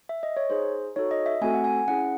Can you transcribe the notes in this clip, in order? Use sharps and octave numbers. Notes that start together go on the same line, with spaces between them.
E5
D#5
C#5
D#4 G#4 C5
D#4 F#4 A4 C#5
D#5
E5
A3 C4 F#4 A4 G#5
F#5
G#5
C#4 E4 G#4 F#5